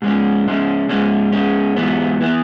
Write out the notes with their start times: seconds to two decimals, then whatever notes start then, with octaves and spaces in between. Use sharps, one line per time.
0.02 G#2 G#3 C#4
0.46 G#2 G#3 C#4
0.89 G#2 G#3 C#4
1.32 G#2 G#3 C#4
1.76 G#2 E3 B3
2.21 E3 B3